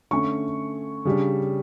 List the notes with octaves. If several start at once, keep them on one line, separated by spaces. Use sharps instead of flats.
D3 A3 C#4 C#6
C#3 G3 D4